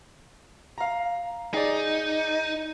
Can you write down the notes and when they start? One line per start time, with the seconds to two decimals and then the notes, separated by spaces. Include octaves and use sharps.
0.78 F5 A#5
1.54 D#4 G#4 D5